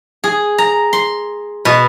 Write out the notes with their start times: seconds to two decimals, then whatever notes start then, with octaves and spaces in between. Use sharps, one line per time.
0.24 G#4
0.58 A#5
0.93 C6
1.65 B2